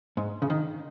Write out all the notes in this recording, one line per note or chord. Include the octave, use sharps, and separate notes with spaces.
G#2
C#3
D#3